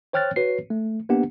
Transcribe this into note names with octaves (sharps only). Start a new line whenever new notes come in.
C5 C#5 G5 F6 F#6 A6
F#4 B4 C#5 C7
A3
A#3 B3 D4 G4 F#5